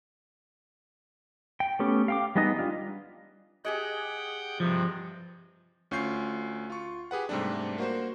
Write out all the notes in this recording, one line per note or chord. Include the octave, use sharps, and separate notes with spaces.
G5
A3 B3 C#4 G4
F5 G5 D6
G3 G#3 B3 D#4 D#5
G3 D4 F4
G4 G#4 D#5 F#5 G5
G2 C3 F3
D2 C#4 F4 C#6 G6 C7
F4 C#6
G4 G#4 B4 F#5
G#2 C3 G3 A3 D4
A#3 F#4 C5